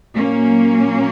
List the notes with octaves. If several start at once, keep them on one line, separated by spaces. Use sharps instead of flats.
A#2 F#3 A#3 C#4